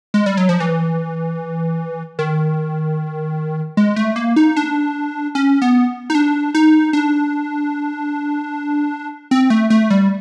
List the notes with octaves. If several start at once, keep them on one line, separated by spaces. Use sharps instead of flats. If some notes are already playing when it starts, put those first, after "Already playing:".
G#3
G3
F#3
F3
E3
D#3
G#3
A3
A#3
D#4
D4
C#4
B3
D#4
D4
D#4
D4
C4
A3
A3
G3